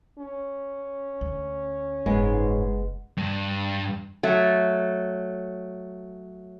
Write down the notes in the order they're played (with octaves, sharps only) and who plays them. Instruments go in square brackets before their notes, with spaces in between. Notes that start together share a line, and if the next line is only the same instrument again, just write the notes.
[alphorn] C#4
[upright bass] D2
[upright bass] F#1 [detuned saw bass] G#2 [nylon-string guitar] G#3 B3
[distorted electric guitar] G2
[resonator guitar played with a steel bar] F#3 A3